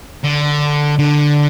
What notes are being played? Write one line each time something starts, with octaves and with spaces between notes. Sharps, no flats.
D3
D3